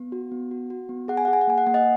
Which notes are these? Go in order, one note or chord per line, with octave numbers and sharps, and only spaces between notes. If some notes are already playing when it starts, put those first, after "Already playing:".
Already playing: B3
F#4
B3
F#4
F#4
B3
G#4 F#5
G#5
G#4 F#5
G#5
F#5
A#3 G#5
F#5
A#3 G#5
D#5 F#5